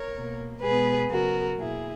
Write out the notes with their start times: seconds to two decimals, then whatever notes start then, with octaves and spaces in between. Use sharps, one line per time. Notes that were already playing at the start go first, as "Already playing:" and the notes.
Already playing: A#4 C#5
0.13 B2 A#3
0.62 B2 G#3 B3 G#4 B4
1.11 C#3 F#3 B3 F#4 A#4
1.59 B2 A#3 E4 G#4